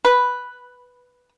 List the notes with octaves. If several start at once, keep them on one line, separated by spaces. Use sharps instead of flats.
B4